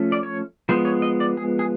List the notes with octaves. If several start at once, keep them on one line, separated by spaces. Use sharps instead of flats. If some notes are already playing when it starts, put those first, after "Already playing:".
Already playing: F3 A3 C#4
D5
C#5
F3 G#3 B3 C5
C#5
D#5
D5
G#4
G#4